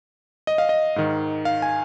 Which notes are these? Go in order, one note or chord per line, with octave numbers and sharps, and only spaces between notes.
D#5
F5
D#5
G#2 D#3
F5
G#5